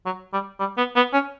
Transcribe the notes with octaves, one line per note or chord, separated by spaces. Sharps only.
F#3
G3
G3
B3
B3
C#4